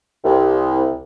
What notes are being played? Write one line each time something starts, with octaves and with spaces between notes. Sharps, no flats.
C2